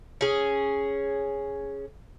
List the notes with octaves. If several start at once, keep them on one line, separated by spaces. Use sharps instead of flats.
C#4 G#4